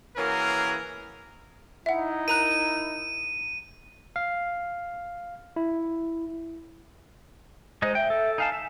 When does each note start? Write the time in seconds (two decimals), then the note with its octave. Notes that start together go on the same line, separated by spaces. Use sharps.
0.17 E3 A#3 C#4 F#4 G#4 A#4
1.86 D#4 E4 E5 F#5
2.28 A#4 A#5 F#6 D#7
4.16 F5
5.56 E4
7.82 G#3 D#4 C5 D#5
7.95 E5 G5
8.10 A4
8.38 D#4 F5 G#5 A5
8.52 E5